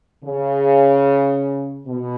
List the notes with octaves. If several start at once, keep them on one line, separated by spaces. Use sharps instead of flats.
C#3
B2